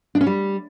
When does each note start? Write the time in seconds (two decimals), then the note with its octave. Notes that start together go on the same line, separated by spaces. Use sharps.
0.15 D4
0.21 C#4
0.26 G3